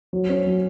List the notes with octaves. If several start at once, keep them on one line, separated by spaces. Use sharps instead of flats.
F#3
C#4
F#3